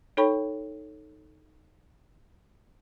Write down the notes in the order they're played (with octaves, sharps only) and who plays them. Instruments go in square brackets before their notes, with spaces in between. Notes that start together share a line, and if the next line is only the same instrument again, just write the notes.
[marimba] D#4 A4 C#5 G5 B5 C#6